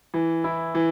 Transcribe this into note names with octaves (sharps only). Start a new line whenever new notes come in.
E3
E4
E3